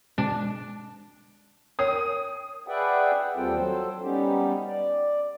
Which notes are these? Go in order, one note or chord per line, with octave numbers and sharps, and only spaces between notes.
B2 G#3 D4
A#4 C#5 G5 D#6
G#4 B4 D5 E5 F#5 G5
D#2 G3 C4 F4 A4 G5
F#3 A4 C5
G3 B3 C#4 D#4 G4
D5